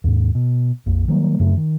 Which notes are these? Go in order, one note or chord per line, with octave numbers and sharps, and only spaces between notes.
D#2 G#2
B2
A#1 F2
D#3 F#3 G3 A#3
F#2 C#3 A3
D#3